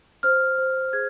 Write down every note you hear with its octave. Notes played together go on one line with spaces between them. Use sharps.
C5 F6
C5
G#4 G#6